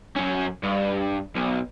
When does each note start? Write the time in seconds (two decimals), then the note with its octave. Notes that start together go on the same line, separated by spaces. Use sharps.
0.16 F#2 C#4
0.63 G2
1.36 B1